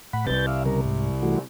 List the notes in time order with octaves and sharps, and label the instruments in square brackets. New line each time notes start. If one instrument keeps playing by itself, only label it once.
[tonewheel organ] A2 F#5 B5
[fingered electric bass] C2 C3 [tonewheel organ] B4 G6 A6
[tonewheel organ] D5 E5 F5
C#3 G3 A#4
G#2
E3 A3 F#4